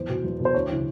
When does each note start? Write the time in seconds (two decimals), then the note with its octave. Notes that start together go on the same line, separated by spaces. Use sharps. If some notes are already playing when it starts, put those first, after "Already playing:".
Already playing: E2 C5
0.09 B2
0.24 E2
0.40 B2
0.45 C5
0.54 D2 C#5
0.69 C#3 E3